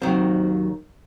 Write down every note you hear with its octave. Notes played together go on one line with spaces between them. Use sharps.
D#2 D#3 F#3 C4